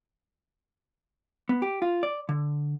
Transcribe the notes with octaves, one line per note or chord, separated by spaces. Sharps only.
B3
G4
F4
D5
D3